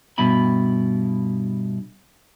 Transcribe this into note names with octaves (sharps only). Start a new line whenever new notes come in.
G2 B2 E4 B5